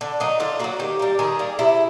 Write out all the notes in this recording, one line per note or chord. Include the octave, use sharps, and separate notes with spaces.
D3
F#3 A#3 D#4
D3 F4
F#3 A#3 F#4
D#3 G4
G3 A#3
D#3 G#4
G3 A#3
C3 E4